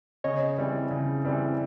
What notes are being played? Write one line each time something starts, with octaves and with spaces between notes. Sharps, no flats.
C#3 C#5 D#5
E3 G3 C4
C#3
E3 G3 C4